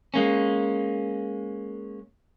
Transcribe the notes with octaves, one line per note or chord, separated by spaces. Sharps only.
G#3 A#3 C#4